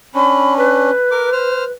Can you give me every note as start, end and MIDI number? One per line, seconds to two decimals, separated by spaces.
0.15 0.90 61
0.15 0.90 62
0.15 0.54 83
0.57 1.71 71
1.11 1.30 70
1.11 1.30 86
1.32 1.64 72
1.32 1.64 89